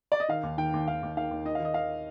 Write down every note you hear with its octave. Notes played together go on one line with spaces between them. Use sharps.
D5
D#5
D#3 F5
D#2
D#3 G5
D#2
D#2 F5
D#2
D#3 F5
D#2
D#3 D#5
F5
D#3
D#5
D#3 F5